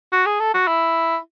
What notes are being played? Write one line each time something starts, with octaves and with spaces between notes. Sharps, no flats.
F#4
G#4
A4
F#4
E4